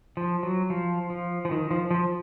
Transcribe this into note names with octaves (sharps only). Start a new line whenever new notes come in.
F3
F#3
F3
F3
F3
D#3
F3
F3